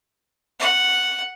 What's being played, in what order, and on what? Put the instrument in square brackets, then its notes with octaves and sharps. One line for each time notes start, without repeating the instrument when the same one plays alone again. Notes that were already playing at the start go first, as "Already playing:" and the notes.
[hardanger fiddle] F#5